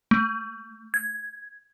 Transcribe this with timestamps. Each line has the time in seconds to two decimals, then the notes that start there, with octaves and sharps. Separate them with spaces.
0.11 A3
0.94 G#6